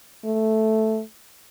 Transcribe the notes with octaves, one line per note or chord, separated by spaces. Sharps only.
A3